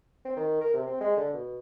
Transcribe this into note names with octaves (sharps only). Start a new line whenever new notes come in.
C4
D#3
A#4
C3
C4
G#3
D3
B2